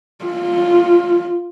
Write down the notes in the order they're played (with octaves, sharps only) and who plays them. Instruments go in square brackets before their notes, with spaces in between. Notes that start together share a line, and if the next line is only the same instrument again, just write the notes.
[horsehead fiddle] F4